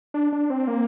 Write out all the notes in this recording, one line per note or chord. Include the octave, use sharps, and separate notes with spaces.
D4
D4
C4
A#3